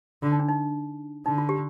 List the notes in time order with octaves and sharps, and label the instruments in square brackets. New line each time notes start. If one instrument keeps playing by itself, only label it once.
[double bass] D3 [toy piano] F4
[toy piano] D#4
D4
D#4
[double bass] D3 [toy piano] D#4
[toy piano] F4
G4